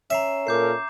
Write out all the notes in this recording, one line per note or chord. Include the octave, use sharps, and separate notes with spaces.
C#4 E5 A#5 C7 E7
A#2 A4 A#4 D6 G6 C7